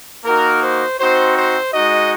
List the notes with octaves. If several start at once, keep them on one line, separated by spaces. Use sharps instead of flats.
A#3 D#4 F#4 A#4
C5
C4 D#4 F#4 C5
C5
G#3 D#4 F#4 D#5